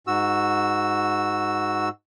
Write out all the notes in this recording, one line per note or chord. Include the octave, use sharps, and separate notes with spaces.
G#2 F#4 E6